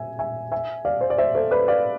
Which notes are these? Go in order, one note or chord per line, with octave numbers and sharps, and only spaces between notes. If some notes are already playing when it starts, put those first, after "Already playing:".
Already playing: E5 G#5
E5 G#5
E5 G#5
D5 F5
C5
D5
C5 E5
A4 C5
B4 D5
D5 F5